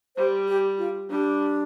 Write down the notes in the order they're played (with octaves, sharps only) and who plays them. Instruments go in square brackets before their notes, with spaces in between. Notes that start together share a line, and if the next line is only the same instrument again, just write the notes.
[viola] G3 [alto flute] C5
[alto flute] G4
F4
[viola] G3 [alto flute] D4